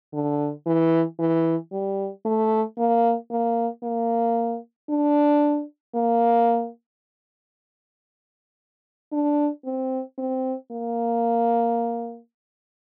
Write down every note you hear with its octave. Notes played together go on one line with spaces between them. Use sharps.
D3
E3
E3
G3
A3
A#3
A#3
A#3
D4
A#3
D4
C4
C4
A#3